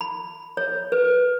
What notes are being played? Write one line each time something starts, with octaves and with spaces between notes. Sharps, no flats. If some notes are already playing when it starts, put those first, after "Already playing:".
B5
C#5
B4